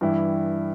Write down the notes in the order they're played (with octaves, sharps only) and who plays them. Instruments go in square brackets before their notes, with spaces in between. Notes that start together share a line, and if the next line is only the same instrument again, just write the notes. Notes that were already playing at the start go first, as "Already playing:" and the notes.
[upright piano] G2 E3 G3 E4